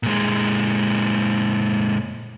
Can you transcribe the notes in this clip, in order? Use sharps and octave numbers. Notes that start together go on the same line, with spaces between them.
A#2 G#3